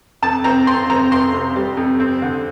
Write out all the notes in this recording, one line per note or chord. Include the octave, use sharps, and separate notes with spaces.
F2 A5
C4 A#5
F2 C6
C4 A#5
F2 C6
C3
G3
F2
C4
D3